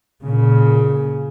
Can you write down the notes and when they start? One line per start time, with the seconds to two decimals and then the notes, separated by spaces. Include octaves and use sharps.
0.23 A#2 C#3